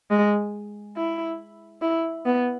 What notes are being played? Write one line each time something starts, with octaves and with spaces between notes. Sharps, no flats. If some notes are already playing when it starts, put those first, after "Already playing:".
G#3
E4
E4
B3